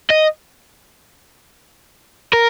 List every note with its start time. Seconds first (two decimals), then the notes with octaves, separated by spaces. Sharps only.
0.10 D#5
2.33 A#4